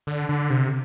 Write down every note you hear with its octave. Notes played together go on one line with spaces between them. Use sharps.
D3
D3
C3